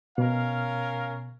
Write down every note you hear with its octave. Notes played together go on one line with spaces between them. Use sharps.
B2 C#4 A#4 F5